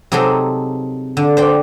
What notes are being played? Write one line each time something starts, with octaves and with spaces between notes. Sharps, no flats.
C3 F#3 D#4 G#4 A4 C6
D3
C5 D5 G5